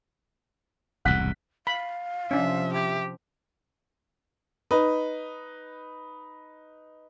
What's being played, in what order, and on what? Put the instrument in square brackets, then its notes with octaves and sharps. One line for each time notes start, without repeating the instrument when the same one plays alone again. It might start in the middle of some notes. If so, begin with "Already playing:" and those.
[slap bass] E1 C2 G#2 [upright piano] F#5 F#6 B6
[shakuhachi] F5 [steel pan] B5
[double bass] C3 F3 [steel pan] C#4 D4 [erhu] E5
[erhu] G4 [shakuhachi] E5
[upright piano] D#4 B4